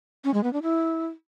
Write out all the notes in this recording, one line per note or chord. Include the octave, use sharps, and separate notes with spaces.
C#4
G#3
B3
D4
E4